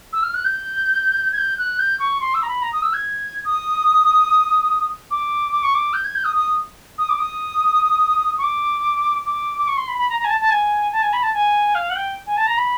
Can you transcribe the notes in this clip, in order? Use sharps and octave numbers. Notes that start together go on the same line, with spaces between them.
E6
F6
F#6
G6
G#6
G6
F#6
G6
C#6
C6
E6
A#5
B5
A#5
D#6
E6
G#6
D#6
D6
D6
C#6
D6
G6
G#6
G6
D#6
D#6
D#6
D6
D#6
C#6
D6
D6
D6
C#6
C6
B5
B5
A#5
A#5
G#5
A5
A5
G#5
A5
G#5
B5
A5
G#5
F5
F#5
G5
G#5
A5
A#5
B5